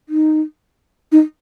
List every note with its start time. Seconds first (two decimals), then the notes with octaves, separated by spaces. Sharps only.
0.09 D#4
1.12 D#4